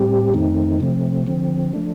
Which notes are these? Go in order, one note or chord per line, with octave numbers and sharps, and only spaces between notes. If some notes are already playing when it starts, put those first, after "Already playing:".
Already playing: A2 G3 C4 G4
F2 D#3 A3 C4 D#4
C3 F3 A3 C4
D3 F3 C4
F3 A3 D4